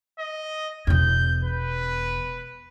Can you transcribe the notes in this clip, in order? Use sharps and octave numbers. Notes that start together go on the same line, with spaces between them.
D#5
E1 E2 G6
B4